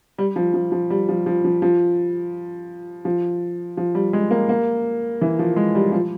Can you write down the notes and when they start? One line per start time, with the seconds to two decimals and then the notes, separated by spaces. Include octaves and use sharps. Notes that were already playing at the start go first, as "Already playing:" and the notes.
0.18 G3
0.36 F3
0.54 F3
0.72 F3
0.90 G3
1.09 F3
1.26 F3
1.45 F3
1.62 F3
3.05 F3
3.77 F3
3.95 G3
4.13 G#3
4.31 A#3
4.49 A#3
5.21 E3
5.39 F3
5.56 G#3
5.75 G3
5.93 F3